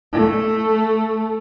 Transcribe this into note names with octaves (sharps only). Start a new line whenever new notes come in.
A3